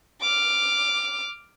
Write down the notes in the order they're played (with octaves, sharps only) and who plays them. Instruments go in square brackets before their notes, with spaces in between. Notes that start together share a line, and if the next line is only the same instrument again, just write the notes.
[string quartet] D6 F6